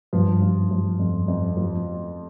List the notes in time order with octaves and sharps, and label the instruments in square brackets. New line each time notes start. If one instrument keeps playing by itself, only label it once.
[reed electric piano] G2 [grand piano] F3
[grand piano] F3
F3
F2
F2
F3